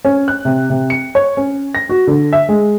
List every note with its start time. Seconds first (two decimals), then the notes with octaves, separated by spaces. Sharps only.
0.05 C#4
0.28 F#6
0.45 C3
0.70 C3
0.90 C#7
1.15 C#5
1.37 C#4
1.75 A#6
1.89 F#4
2.07 D3
2.33 E5
2.49 G#3